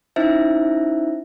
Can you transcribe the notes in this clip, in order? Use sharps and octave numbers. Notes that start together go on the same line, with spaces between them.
C#4 D#4 E4 C5 E5